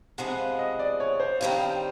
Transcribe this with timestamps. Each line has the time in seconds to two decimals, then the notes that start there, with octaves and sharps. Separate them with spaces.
0.18 C3 F3 G#3 B3 F#5
0.39 F5
0.59 D#5
0.79 D5
1.00 C#5
1.20 C5
1.40 G2 D#3 G3 C4 F5
1.61 G5